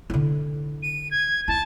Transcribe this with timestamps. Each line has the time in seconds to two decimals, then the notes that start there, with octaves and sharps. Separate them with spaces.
0.10 D3 E4
0.83 D#7
1.11 G#6
1.48 E4 A5